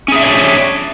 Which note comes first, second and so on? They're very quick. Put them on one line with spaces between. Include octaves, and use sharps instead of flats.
C#4 G#4 E5 D4 C#5